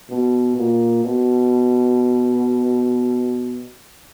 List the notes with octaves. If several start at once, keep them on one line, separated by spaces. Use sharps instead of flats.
B2
A#2
B2